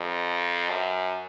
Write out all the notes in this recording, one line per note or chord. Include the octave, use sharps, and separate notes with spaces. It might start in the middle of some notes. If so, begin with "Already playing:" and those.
Already playing: F2
F#2